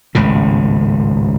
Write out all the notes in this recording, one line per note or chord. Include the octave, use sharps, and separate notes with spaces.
G#1 C#2 A2 C#3